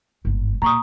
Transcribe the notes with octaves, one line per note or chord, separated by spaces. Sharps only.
G1 G#2
A#2 A#5 C#6 D#6